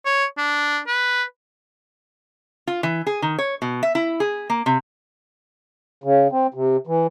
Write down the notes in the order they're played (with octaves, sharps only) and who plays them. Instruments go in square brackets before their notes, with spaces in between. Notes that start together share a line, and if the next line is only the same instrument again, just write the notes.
[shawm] C#5
D4
B4
[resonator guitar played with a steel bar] F4
E3
G#4
D#3
C#5
B2
E5
E4
G#4
A#3
C3
[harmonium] C#3
C4
C3
E3